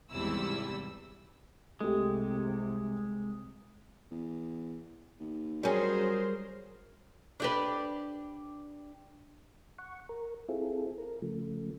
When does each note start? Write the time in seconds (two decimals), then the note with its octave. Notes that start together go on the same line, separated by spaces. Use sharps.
0.11 G#1 E2 C3 G3 E4 E6
1.80 C2 C3 G#3 A3 G4
4.11 E2
5.20 D#2
5.63 F#3 G3 C#4 G#4 A#4 C5
7.40 D4 G4 B4
9.78 F#5 C#6
10.09 A#4
10.49 C4 E4 F4 G#4 A4
10.98 A#4
11.22 C#3 F3 A3